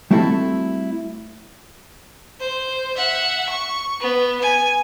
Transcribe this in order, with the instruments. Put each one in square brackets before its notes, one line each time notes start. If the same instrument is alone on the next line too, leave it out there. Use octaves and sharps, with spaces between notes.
[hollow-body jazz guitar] G3 A3 C4 E4 F#4 A4
[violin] C5
E5 F#5
C#6
B3
G#5